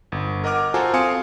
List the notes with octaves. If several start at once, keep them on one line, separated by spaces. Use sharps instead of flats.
G1
A#4 D#5 F#5 D6 F6
F4 F#4 A4 C5 G#5 A#5
C4 F5 G#5 C6 D#6 C#7